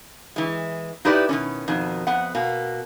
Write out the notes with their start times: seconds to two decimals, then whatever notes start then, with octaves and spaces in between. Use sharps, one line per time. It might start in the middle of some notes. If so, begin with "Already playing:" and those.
0.36 E3 G#3
1.05 D#4 E4 G4 B4 D5 D#5
1.29 B2 D#3 C#4
1.68 F2 B2 D#3
2.07 F2 B3 F#5
2.35 B2 A#3